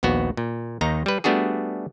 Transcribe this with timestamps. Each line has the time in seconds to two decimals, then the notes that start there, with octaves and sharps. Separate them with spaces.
0.03 A#1 D#2 B3 F#4
0.37 A#2
0.81 D#2 D#3 D#4 A#5
1.06 G3 B4
1.24 G3 A3 B3 D4 F#4 G#4